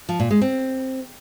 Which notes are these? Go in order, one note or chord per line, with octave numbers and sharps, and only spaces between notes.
F3
A#2
G#3
C4